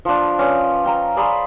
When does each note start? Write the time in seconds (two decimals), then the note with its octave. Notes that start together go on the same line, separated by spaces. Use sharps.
0.05 F3 D4
0.39 C#4 B4 D5 D#5
0.85 G5 A#5
1.17 G#4 D5 B5 C6